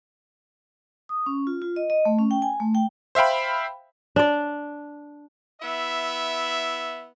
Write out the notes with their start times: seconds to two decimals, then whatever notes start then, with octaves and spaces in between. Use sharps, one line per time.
1.09 D#6
1.26 C#4
1.47 F4
1.62 F4
1.76 D#5
1.90 D#5
2.05 A3
2.19 C#4
2.31 G5
2.42 G#5
2.60 A3
2.75 G5
3.15 C5 E5 F5 G5 B5
4.16 D4 D5
5.61 B3 E4 E5